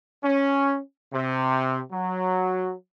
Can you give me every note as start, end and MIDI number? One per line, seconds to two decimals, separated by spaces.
0.24 0.79 61
1.13 1.81 48
1.92 2.74 54